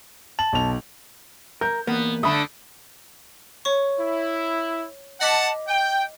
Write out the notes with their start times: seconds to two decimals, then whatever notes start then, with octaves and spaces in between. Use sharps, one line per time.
0.39 A5 F#7
0.53 B1 F7
1.61 A#4 G6
1.87 E2 A#3 B3
2.23 D3 A3 B5 D#6
3.65 C#5 C#6
4.00 E4
5.21 D#5 F#5 A5 D6 B6
5.68 G5